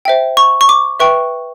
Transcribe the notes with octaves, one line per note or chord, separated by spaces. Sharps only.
C5 E5 G5
C#6
C#6
D6
B4 E5 G5 C#6